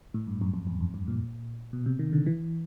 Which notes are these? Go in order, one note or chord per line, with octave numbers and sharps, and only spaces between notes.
A2
G2
F#2
F2
E2
F2
G2
A#2
B2
C3
D#3
D3
E3